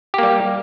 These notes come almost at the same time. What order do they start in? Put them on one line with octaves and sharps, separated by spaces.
G4 A#3 G3